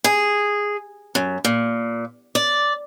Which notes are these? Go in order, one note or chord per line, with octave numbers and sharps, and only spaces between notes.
G#4
F#2
A#2
D5